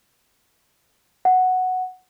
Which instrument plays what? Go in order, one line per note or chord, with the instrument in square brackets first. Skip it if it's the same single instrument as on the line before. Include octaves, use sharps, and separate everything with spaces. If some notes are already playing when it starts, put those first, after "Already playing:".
[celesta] F#5